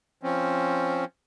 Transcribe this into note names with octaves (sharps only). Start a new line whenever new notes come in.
F3 C4 C#4